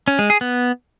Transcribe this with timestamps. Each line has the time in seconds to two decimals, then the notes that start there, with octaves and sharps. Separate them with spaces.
0.08 C#4
0.19 G#3
0.30 G#4
0.41 B3